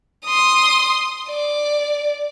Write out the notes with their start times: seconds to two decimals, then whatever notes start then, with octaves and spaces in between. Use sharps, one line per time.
0.25 C6 D#6
1.29 D5